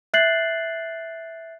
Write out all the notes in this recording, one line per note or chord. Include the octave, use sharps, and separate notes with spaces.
E5 F#6 G6 A6 C7 F#7